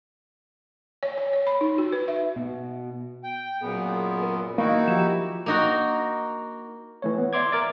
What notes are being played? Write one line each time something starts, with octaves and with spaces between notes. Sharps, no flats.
C#5
C#5
C#5
B5
D#4
F#4
B4
E5
B2
G5
F#2 A#2 B3 G#4
A#4
D#3 A#3 D#4 E4 F#4 F5
F3 G4 E7
A#3 D#4 F#4
E3 A3 C#5
B3
D5 E5 C6 D6 G#6
A#4 D6 A6